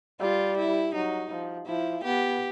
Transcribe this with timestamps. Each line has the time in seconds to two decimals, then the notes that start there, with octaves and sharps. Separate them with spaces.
0.20 G3 F4
0.57 E4
0.94 F#3 D#4
1.31 F3
1.67 F3 E4
2.04 B3 G4